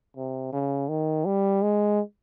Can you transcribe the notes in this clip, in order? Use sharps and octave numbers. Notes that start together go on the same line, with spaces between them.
C3
C#3
D#3
G3
G#3